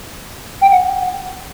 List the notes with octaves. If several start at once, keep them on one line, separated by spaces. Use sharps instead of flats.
G5
F#5